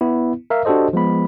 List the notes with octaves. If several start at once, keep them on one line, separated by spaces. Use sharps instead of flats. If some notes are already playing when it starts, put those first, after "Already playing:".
B3 E4
A#4 E5 F5
D4 F#4 G4 A4 C5 D#5
F3 G#3 B3 B5